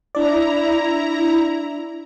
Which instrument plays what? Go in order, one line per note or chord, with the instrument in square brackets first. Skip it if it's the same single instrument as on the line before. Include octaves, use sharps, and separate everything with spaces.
[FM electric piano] D4 D5 [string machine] E4 A#5